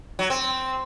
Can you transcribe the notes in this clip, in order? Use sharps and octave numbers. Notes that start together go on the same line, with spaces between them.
F#3
C4